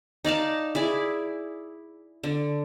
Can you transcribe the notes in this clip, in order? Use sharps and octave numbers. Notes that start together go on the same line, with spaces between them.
D#4 D5 F5 A5
E4 G#4 D5
D3